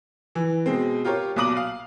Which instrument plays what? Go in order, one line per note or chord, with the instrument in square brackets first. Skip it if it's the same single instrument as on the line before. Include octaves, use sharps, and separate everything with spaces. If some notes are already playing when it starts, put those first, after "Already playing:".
[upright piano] E3
B2 G#3 C4
F4 G4 A#4 C#5
B1 A#2 D6 D#6 F#7
F5